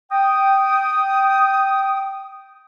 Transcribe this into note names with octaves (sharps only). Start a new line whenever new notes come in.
G5 D#6